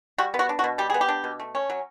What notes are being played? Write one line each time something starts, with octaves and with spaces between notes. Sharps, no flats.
G3 F#4
B3
F#4
D4
F#4
B2
G3 G4
B3 G#4
G4
D4
B2
A3
C#4
F#3